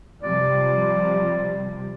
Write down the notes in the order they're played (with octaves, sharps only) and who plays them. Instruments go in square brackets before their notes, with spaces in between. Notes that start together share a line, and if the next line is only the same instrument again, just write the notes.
[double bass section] C3 F3 G3 [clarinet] D5